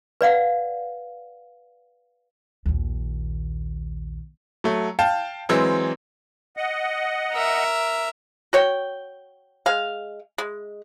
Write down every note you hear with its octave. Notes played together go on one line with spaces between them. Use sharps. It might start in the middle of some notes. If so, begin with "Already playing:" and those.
B4 D5 F5 F#5
A#1 D#2
F#3 A3
F5 G5 A5
E3 F#3 G#3 C4
D#5 F#5
A#4 E5
F#4 C#5 G5
G#3 F5
G#3